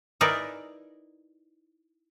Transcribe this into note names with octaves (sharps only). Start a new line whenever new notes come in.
D#4 E4 G#4 A#4 B4 D5